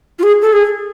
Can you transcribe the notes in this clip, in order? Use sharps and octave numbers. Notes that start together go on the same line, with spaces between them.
F4
G#4
A4
G#4